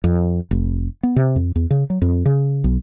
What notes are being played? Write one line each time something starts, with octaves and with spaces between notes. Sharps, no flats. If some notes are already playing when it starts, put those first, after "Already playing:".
F2
F1
B3
C3
F2
E2
C#3
F#3
F2
C#3
B1